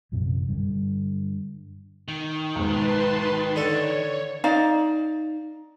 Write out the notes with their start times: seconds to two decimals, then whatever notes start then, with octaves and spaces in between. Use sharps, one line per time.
0.12 A#1 F#2 C3 E3
0.48 G2 D3
2.08 D#3
2.55 B1 G#2 B4 A5 C6
3.56 D3 A4 C#5
4.44 D#4 D5 D#5 F5